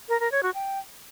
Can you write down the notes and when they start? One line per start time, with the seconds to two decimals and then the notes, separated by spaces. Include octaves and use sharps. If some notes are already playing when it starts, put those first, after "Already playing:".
0.09 A#4
0.20 A#4
0.32 C#5
0.43 F#4
0.54 G5